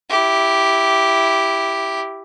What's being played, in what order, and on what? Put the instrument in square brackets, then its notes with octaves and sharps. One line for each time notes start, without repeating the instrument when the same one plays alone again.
[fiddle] E4 G4